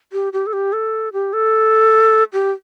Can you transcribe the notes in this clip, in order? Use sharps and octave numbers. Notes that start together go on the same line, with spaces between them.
G4
G4
A4
G4
A4
G4
A4
G4